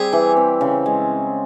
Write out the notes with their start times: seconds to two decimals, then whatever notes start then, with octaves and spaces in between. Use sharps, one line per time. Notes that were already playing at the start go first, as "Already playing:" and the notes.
Already playing: G3 C4 G4 G#4
0.13 E3
0.37 C4
0.61 C#3
0.86 G#3